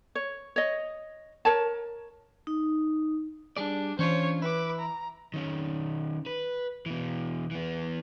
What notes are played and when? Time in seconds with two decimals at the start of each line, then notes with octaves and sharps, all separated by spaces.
0.15 C#5
0.56 C#5 D#5
1.45 A#4 C#5 A5
2.47 D#4
3.57 G3 D4 G#4 D5
3.99 E3 C#4 D4 F4 C5 C#5
4.42 E4 B4 D6
4.79 A#5
5.34 D#3 C#4
6.26 B4
6.86 B2 E3
7.51 E3 B3